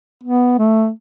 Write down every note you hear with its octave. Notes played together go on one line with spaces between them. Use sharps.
B3
A3